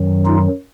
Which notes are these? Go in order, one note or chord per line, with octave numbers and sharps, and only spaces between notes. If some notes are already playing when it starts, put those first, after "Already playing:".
Already playing: F#2 D#3 F#3
D#4 F4